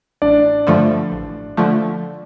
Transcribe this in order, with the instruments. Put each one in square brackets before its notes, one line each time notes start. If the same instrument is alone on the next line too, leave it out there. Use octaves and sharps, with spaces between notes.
[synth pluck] A1 [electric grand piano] D4 D5
[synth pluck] G2 D3 F3 A3
A1
D3 F3 A3